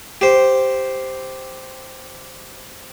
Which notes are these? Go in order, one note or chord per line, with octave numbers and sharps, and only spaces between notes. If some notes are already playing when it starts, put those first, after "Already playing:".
G4 C5